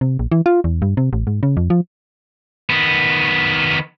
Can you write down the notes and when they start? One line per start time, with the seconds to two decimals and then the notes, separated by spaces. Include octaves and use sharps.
0.01 C3
0.19 A#1
0.32 E3
0.46 F4
0.64 E2
0.82 G2
0.97 C3
1.13 A1
1.27 G#2
1.43 C#3
1.57 F2
1.70 F3
2.70 D#3 B3